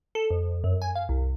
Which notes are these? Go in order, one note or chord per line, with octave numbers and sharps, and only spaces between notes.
A4
F2
F#2
G#5
F5
C2